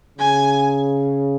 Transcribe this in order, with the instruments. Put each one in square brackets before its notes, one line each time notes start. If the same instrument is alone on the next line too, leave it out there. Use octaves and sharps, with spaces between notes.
[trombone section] C#3 [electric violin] G#5